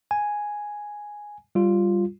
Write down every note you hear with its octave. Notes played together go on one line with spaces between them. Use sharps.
G#5
G3 F4